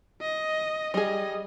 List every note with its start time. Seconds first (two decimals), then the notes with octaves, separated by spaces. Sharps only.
0.21 D#5
0.94 G3 G#4 D#5